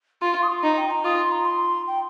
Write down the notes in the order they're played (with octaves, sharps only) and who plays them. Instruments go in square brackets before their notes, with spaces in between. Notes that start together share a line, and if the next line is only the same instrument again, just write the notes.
[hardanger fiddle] F4 [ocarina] C6
[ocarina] C6
D#6
C6
[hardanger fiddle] D#4 [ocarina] A#5
[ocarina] G5
A#5
[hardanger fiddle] F4 [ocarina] D#6
[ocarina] C6
A#5
C6
G5